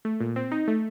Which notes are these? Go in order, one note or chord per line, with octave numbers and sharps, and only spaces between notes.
A3
A#2
C4
D#4
A3